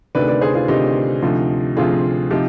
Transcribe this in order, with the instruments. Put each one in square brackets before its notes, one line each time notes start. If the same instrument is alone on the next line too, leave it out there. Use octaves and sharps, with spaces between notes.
[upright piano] D2 C3 D#3 B4 D5
B4 D5
G#4 C5
F4 G#4
D2 C3 D#3 D#4 G4
D2 C3 F3
D2 C3 F3 F4 G#4
C3 F3 D#4 G4